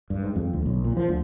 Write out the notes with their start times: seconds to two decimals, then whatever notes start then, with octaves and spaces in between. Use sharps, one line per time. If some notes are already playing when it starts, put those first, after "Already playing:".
0.10 G2
0.23 G#2
0.36 F2
0.53 D2
0.66 B1
0.84 A#2
0.97 F3
1.09 D2